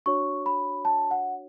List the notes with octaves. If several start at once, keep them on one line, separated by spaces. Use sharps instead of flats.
D4 F#4 C#5 C#6
B5
A5
F#5